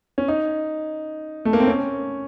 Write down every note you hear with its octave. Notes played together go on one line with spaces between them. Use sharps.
C#4
D#4
A3
A#3
C4
C#4